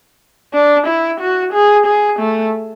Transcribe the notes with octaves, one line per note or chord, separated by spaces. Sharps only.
D4
E4
F#4
G#4
G#4
A3